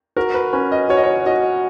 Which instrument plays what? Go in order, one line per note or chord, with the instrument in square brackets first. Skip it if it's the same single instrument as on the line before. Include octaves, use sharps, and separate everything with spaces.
[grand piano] F#4 [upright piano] A#4
[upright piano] B4
[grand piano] C#4 [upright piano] B4
[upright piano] D#5
[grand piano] F#4 [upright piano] C#5
[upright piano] D#5
C#5
[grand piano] F#4 [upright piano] D#5